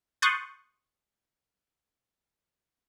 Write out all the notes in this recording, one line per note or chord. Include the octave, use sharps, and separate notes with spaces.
C6 C#6 D#6 F#6 G6 A6